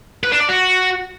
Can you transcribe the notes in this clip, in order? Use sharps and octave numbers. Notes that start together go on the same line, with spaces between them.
B4
D4
D5
F#4